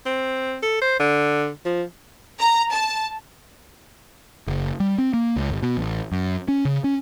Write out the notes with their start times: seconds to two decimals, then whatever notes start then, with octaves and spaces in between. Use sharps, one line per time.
0.06 C4
0.63 A4
0.81 C5
1.00 D3
1.65 F3
2.40 A#5
2.72 A5
4.48 F#1
4.80 G3
4.98 C4
5.14 A#3
5.36 C#2
5.50 G1
5.62 B2
5.77 A1
6.12 F#2
6.48 C#4
6.65 C#3
6.84 C#4